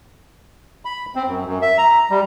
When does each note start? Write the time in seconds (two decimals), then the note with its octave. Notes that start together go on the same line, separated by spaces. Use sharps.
0.85 B5
1.15 C4
1.27 F#2
1.45 F#2
1.62 E5
1.78 A#5
2.10 G3